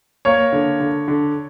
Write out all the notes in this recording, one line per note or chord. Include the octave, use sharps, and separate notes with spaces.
A#3 C#5
D3
D3
D3